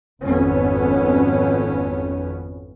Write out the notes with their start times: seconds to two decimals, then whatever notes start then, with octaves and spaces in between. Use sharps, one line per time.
0.24 G#1 F2 B3 C#4